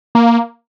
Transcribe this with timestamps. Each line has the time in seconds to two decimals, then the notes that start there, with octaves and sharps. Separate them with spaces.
0.15 A#3